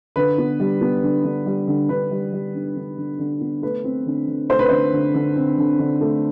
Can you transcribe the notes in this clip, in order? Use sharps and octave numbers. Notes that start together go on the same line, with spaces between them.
D3 B4
B3
G3
B3
D3
D3
G3
D3
D3 B4
G3
G3
D3
D3
D3
D3
B3
A3 B4
C4
D3
D3
A3 C5
B4
D3 C5
D3
D3
C4
D3
D3
A3